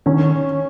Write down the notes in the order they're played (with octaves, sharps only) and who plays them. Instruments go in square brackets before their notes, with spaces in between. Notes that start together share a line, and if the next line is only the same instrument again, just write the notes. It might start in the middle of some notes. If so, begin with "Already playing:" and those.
[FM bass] D#3 [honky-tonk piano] C#4